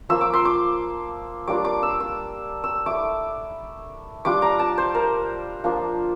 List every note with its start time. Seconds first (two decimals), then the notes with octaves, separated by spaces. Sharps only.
0.09 F3 A#3 F4 E6
0.21 D6
0.33 C6
0.45 D6
1.48 G3 A#3 D4 F4 D6
1.65 D6
1.83 E6
2.00 E6
2.64 E6
2.86 A3 E4 D6
4.25 G3 D4 F4 D6
4.42 A#5
4.60 A5
4.78 C5
4.95 A#4
5.64 F3 A#3 D4 F4